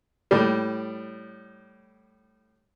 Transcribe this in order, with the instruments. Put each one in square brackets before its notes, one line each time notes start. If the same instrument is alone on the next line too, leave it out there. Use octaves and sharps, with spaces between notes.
[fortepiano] A2 G3